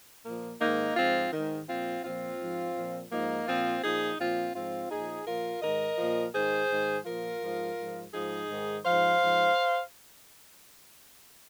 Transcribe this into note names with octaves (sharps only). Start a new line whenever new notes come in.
A#2 F3 A#3
G#2 D#3 A#3 D#4
G#2 F3 C4 F4
G#2 D#3
A#2 F3 C4 F4
A#2 F3 C4 F4
G#2 F3
A#2 F3
G#2 F3 A#3 D#4
A#2 F3 C4 F4
A#2 F3 D#4 G#4
A#2 F3 C4 F4
G#2 F3 C4 F4
A#2 F3 D#4 G#4
A#2 F3 F4 A#4
G#2 D#3 A#4 D#5
A#2 F3
G#2 D#3 G#4 C5
G#2 D#3
A#2 F3 F4 A#4
G#2 F3
G#2 F3
G#2 F3 D#4 G#4
G#2 D#3
G#2 F3 C5 F5
G#2 F3